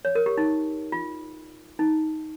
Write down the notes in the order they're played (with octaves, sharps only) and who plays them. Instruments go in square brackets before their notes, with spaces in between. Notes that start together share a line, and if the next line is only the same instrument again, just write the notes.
[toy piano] C#5
A#4
G4
D#4
F4
D#4